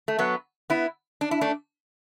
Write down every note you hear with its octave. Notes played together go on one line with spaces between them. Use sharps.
A3
F#3 B3
B3 E4
D4
E4
A3 D4